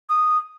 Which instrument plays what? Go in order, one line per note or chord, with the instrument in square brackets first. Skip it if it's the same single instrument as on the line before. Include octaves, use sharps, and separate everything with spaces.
[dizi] D#6